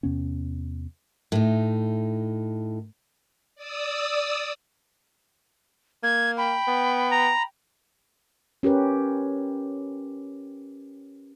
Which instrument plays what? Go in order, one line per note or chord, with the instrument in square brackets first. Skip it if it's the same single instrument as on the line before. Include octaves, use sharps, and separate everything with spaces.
[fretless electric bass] E2 C3 B3 C#4
[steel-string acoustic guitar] A2 D#4
[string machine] D5 D#6 E6
[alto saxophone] A#3 [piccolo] G#6
[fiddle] G5 [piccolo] B5
[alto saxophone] B3
[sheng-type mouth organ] A#5
[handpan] C#4 G4 A#4 B4